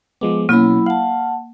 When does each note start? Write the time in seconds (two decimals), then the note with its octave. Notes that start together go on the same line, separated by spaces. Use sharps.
0.21 F3 G#3 B3 D6
0.49 B2 F#3 A#3 C#4 E4 B5
0.86 F5 F#5 A5